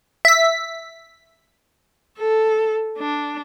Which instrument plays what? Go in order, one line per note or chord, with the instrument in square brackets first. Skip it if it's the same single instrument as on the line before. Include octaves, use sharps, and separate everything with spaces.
[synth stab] E5 B6
[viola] A4
D4